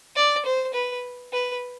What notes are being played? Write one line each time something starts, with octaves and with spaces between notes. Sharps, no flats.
D5
C5
B4
B4